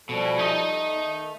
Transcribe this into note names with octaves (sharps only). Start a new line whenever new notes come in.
B2 F3 G3 A4
G#5 B5
A3 D#4 D#5
E2
D#3